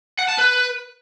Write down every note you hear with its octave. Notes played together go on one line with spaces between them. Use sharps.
F#5
A5
B4